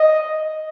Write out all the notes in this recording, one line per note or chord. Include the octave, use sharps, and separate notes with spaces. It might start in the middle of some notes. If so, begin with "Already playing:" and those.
Already playing: D#5